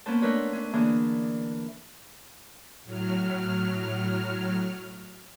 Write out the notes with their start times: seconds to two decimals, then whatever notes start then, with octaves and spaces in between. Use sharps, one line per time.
0.06 A#3 B3 C#4 B4 C5 A5
0.21 A3 D4 A#4 B4 C#5 C6
0.53 C#4 D4
0.74 D3 E3 A#3 D4 G#4
2.84 A2 F#3 F6